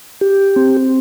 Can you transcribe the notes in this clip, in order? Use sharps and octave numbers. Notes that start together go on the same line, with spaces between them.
G4
C4